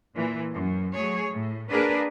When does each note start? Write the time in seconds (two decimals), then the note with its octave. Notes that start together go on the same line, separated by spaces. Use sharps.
0.15 A#2 E3
0.53 F#2
0.94 F#3 A3 G#4 C#5
1.32 A2
1.70 A#3 D4 G#4 A#4 B4